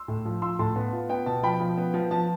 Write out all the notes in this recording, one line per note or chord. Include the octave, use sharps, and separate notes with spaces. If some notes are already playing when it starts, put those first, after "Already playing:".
Already playing: C6 E6
A2
F3
F4 C6 E6
A2 A5 C6
B3 A5
F4
B3 G5
B2 A5
F3 G5 B5
F3
B3
F3
F3 A5